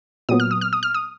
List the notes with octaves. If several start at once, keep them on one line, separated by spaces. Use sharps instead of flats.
A#2 F#3 B3 D#6
F6
D#6
F6
D#6
F6
D#6